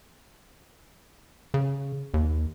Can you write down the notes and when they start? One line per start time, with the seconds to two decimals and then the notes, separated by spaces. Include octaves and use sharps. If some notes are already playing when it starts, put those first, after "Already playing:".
1.54 C#3
2.14 D#2